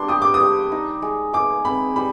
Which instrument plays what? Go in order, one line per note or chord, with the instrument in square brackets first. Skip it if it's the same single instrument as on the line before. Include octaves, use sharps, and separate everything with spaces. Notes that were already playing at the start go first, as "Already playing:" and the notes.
Already playing: [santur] G3 D4 [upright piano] C6
[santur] G4 [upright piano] D#6
[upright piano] D6
D#6
[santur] G3
D#4
G#3
[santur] G#3 [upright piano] D6
[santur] C4 [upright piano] B5
[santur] G3 [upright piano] B5